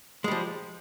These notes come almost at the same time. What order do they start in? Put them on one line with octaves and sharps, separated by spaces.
G#3 G3 F3